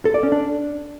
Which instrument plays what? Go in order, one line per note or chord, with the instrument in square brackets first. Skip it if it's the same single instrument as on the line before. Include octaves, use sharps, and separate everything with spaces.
[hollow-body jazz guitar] A4
D5
C#4
D4